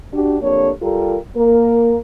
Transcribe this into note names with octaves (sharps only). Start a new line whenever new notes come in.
D4 F#4 G4
F2 A#3 D4 G4 A4 C#5
G3 F4 G4 A4 A#4
A#3 A#4